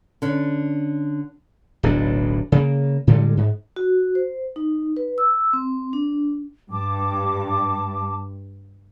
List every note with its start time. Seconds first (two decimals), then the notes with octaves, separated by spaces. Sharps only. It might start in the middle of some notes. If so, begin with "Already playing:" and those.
0.22 D3 C#4 D4
1.83 D1 B1 A2 D4
2.52 C#3 A#3
3.07 A2 D3 G3 G#3
3.37 G#2
3.76 F#4
4.15 C5
4.56 D#4
4.97 B4
5.18 E6
5.53 C4
5.93 D4
6.71 G2 A5 D6